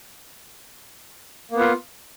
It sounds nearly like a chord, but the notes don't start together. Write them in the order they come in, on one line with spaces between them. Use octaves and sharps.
A#3 B3 F4